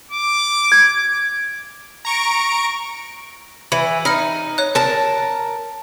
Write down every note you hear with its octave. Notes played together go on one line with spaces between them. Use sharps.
D6
G#6
A#5 C#6 D7
E3 B5
D#4 B5 F6 C#7
C#5 F#6
A#4 A5